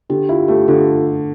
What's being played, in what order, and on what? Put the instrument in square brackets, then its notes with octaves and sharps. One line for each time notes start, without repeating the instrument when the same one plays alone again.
[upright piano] D3 [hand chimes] G4
[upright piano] E4 [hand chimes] F4
[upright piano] A3 [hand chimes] G4
[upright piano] D3 [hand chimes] F4 A4